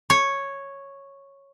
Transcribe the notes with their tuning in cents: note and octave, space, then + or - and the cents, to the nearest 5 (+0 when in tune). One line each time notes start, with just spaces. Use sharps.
C#5 -5